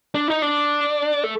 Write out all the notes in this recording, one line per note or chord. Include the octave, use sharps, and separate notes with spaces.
D4
D#4
D4
A3